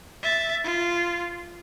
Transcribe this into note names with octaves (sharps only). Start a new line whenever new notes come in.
E5 A6
F4